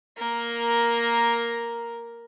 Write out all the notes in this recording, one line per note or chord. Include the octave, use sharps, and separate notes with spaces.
A#3 A#4